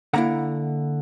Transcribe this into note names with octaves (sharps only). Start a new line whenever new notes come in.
D3 A#3 E4 F#5 A#5